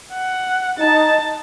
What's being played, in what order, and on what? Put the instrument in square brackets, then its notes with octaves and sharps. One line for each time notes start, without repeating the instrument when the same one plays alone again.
[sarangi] F#5
[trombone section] D#4 [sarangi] A5